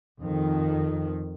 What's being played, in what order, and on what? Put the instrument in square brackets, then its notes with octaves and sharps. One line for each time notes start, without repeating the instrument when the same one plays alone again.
[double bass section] F2 D#3